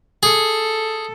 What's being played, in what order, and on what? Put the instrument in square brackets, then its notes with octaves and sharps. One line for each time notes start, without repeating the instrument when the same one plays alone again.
[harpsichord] G#4 [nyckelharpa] A4